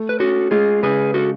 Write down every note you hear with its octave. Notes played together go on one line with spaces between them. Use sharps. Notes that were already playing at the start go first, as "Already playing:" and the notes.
Already playing: A3
B4
C#4 F#4 A4
G#3 F4 G#4
C#3 G#4 B4
F#4 A4